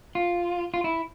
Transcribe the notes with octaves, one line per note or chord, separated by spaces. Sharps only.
F4
F4
E4